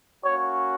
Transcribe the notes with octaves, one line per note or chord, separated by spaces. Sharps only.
A#3 C#4 F#4 C#5